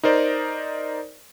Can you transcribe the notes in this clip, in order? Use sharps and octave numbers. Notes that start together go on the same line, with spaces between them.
D#4 A#4 C5 D5